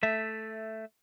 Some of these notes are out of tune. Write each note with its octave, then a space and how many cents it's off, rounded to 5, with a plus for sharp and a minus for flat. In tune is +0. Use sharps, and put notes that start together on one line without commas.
A3 +0 E5 +0